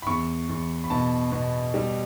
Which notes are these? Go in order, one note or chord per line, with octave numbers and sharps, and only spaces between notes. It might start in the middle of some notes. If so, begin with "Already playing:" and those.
B5
E2 C#6
E2
B5
B2 A5
B2
G3